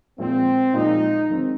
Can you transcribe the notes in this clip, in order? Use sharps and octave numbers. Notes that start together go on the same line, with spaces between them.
A#2 F3 G#3 C4
A#2 F3 G#3 D#4
D#3 G#3 C4